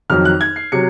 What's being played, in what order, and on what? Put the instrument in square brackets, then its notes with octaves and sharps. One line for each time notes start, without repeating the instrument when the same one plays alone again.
[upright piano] F2 D#3 F#3 F6
F#6
G#6
C7
C3 F#3 C#7